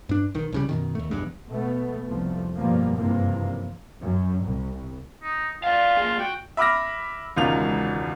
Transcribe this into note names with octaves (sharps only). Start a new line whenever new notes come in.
G2 D4
B1 D#3
C2 C#3 G3
F#2 B2 D#3
D#2 A3
B1 E2 G2
B2 A3 B3
F1 C2 F3 A3
G2 B2 F3 G3 A#3
F#1 G2 C3 E3 F3 A#3
F#2
C2
D#4
F4 D5 F5
A#3 G#4
F#4 G5
E5 B5 D6 F6 A#6
E1 C#2 D#3 F4 F7